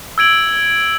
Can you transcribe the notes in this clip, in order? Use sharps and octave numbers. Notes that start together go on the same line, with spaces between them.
E6 G#6 D7 F#7